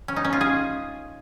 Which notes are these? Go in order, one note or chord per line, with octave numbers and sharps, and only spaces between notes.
C#4
D#4
C#4
F4
G#4